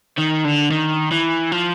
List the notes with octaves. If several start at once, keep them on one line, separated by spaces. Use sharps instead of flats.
D#3
D3
D#3
E3
F3